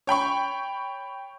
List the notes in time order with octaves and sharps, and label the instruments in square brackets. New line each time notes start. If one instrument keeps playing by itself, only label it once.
[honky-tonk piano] C#5 G5 B5 C#6